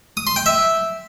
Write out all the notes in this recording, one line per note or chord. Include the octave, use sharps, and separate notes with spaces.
D#6
C6
G5
E5